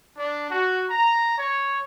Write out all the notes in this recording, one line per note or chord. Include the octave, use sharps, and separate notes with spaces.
D4
F#4
A#5
C#5